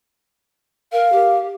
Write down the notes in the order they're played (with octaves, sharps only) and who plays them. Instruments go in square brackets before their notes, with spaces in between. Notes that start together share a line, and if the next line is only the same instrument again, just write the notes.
[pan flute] A#4 [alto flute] F5
[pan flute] G4